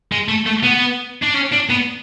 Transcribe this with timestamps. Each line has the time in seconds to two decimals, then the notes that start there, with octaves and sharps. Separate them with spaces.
0.12 G#3
0.29 A3
0.47 A3
0.64 B3
1.23 D4
1.35 C#4
1.53 D4
1.70 B3